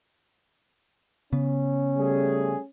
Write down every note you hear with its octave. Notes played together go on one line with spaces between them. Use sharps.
C#3 B3 C#4
G3 A3 G#4